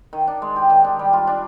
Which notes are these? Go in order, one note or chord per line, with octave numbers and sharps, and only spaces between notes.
D#3
D4
G#3
G4
D#3
D4
G3
F4
D4